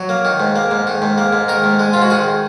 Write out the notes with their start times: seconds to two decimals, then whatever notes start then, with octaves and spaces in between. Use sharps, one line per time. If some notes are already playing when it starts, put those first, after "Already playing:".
Already playing: F#3
0.09 A#3
0.25 D#3
0.40 G#2
0.56 A#3
0.71 G#2
0.87 D#3
1.02 G#2
1.18 A#3
1.33 G#2
1.48 D#3 A#4
1.64 G#2
1.79 G#3
1.93 G#2 F4
2.02 F#4
2.10 D#3 G#4